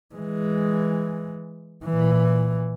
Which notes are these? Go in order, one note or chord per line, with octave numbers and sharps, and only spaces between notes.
E3 G#3
A#2 E3